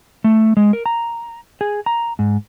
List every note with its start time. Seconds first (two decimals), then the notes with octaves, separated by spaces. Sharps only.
0.24 A3
0.57 G#3
0.73 A#4
0.86 A#5
1.61 G#4
1.86 A#5
2.19 G#2